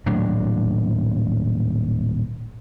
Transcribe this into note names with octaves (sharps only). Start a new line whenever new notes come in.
D#1 A2 F#3 D4